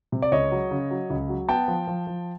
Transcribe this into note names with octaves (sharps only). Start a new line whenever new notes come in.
C3
D5
C#2 C#5 D#5
F#3
C#3
F#3
C#2
F#3
B3 G5 A5
F3
F3
F3